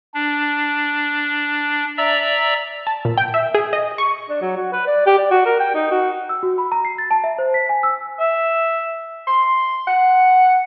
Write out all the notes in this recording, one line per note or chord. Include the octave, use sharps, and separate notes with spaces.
D4
D5 E5 A#5 E6
A5
A#2
G5
E5
G#4
D#5
C#6
D4
F#3
F#4
B4
D5
G4
D5
F#4
A#4
G5
D#4
F#4
E6
F#4
B5
A#5
C7
A6
A5
E5
C5
B6
G#5
E6
E5
C6
F#5